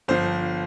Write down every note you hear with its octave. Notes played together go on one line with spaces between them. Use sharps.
G1 F3 C5